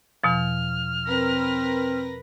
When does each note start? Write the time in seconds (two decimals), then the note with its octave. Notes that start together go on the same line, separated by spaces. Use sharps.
0.24 E2 B2 F3 F6
1.06 C4 A#4 B4 A#6